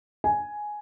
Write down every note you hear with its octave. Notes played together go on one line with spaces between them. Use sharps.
G#5